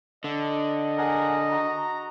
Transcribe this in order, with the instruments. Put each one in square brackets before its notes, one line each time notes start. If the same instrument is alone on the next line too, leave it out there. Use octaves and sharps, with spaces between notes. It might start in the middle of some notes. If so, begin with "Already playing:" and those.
[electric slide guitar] D3 [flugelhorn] D#5
[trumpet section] G#4 A#4 F#5
F#4 A#5